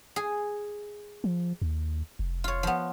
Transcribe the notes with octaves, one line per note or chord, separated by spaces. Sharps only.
G#4
F3
D#2
F1
F4 C#5
F3 B3